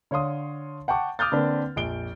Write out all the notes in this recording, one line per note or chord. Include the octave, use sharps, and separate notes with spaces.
D3 C#5 F5 C6 D#6
F#5 G5 A5 C#6 D6
D6 D#6 F6 G6 A6
D3 A#3 C4 D4 B4
A#1 F2 D7 G7